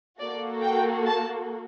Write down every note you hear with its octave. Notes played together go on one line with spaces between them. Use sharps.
A#3 F#4 A4 D5
G5
A5